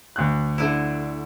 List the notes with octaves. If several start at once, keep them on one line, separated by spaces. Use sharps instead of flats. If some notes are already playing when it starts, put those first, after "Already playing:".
D2 F#6
D3 E4